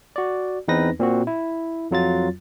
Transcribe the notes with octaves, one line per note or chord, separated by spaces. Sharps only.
F#4 D5
E2 C4 D#4 B4 A#6
A#2 C4 F#4
E4
F2 F#3 F4 A6